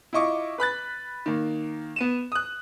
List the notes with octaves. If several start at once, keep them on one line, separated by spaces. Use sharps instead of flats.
E4 F4 D#5 C#6 D6
B4 B5 F#6 A6
D#3 A#3
B3 D#7 E7
D#6 F#6